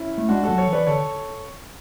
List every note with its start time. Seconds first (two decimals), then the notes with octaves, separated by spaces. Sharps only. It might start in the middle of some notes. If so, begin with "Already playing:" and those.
Already playing: C#4 E4
0.18 A3
0.29 G#3 D4 F#4
0.43 F#4 A4
0.49 F#3
0.58 A4 C#5
0.67 E3
0.73 B4 D5
0.87 D3 A4 C#5